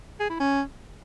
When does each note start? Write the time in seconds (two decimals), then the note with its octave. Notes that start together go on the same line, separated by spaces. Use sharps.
0.20 G#4
0.30 E4
0.40 C#4